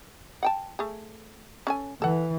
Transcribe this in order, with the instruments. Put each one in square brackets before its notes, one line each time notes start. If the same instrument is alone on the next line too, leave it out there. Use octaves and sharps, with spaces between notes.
[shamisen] F#5 G5 A5
A3 G#4
C#4 A4 G#5
[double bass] E3 [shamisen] A4 F#5